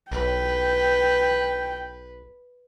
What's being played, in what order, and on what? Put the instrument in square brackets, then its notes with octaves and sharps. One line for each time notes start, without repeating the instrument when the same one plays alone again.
[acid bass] B1 [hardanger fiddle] B4 [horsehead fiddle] G5